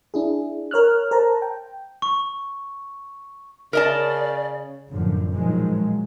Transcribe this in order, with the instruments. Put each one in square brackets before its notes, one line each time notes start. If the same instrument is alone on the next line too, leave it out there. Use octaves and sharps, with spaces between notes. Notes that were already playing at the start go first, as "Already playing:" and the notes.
[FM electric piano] D4 E4 G#4
A#4 C#5 F6 F#6
A#4 C5 A5 A#5
G5
[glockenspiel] C#6
[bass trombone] C#3 [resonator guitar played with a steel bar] A#4 D#5 A5 [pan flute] D5
[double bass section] F#2 A2 D3 F3
A#2 D#3 F3 F#3 G#3